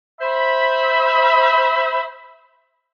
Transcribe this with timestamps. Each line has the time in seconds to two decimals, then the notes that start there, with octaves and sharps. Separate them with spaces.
0.20 C5 E5 B5